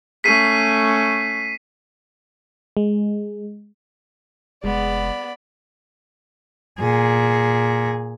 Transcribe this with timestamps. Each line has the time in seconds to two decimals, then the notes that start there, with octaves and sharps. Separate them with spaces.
0.24 A3 C#4 B6 C7 D#7
2.77 G#3
4.64 F1 G#3 B3 D5 B5
6.80 A#2 G#4